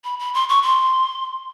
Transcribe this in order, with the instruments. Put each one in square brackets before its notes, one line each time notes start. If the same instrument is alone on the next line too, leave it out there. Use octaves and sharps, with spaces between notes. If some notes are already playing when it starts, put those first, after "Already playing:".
[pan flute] B5
B5
C6
C#6
C6